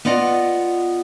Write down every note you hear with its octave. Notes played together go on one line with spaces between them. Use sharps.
B3 F4 D5 D#5 F#5